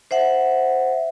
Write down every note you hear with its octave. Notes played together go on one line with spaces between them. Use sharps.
C5 E5 F#5